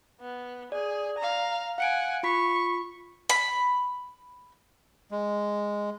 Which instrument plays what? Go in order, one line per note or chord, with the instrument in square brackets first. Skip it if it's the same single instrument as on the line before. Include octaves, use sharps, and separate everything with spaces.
[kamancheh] B3
[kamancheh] G#4 [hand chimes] D5
[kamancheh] F5 A#5
[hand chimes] F5 C#7 D7 [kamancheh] F#5 G#5
[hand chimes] F4 B5 B6 [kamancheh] C#6
[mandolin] B5
[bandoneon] G#3